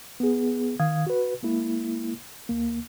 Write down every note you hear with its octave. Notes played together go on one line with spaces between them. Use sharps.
B3 G#4
D#3 F5 D#6 G#6
F#4 B4
G#3 A#3 E4
D2 A#3